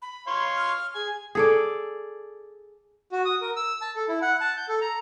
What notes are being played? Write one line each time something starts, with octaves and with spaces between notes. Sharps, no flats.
B5
C#5 F5 C6
F6
G#4 G#5
G#4 A4 D5
F#4
D#6
A#4
E6
A5
A4
E4
F#5
A5
G6
A4
A#5